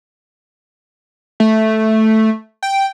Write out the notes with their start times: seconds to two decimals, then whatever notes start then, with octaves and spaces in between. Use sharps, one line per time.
1.40 A3
2.63 G5